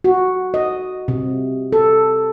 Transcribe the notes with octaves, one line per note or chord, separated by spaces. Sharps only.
F#4
D#5
C3
A4